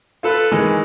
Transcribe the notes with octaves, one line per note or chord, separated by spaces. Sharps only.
F4 A4 B4
D#3 E3 G#3